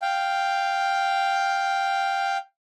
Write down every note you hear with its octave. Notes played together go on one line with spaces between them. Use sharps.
F5 G5